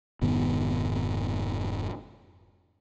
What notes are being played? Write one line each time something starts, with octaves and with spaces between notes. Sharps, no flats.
F1 G#2 D#3 B3